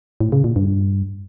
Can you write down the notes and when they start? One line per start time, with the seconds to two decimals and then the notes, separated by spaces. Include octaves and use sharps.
0.21 A2
0.32 C#3
0.44 A#2
0.56 G2